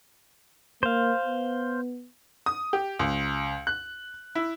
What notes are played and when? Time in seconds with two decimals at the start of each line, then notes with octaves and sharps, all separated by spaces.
0.83 A#3 C5 F5
1.26 B3
2.46 D#6
2.73 G4
2.99 C#2
3.67 F#6
4.35 E4